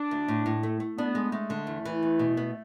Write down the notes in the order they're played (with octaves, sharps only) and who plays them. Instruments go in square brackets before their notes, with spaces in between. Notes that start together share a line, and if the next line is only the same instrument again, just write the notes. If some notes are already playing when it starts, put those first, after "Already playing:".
Already playing: [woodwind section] D4
[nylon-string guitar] D2
A2
A2
A3
A3
[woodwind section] B3 [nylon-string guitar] D4
[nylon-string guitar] G#3
[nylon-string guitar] G#3 [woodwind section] A3
[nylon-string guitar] D3
E2
E3
E2
B2
B3